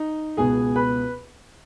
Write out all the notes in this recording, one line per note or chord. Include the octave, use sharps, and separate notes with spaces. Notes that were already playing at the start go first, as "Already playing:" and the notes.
Already playing: D#4
C#2 B2 B3 G#4 G#5
B4 B5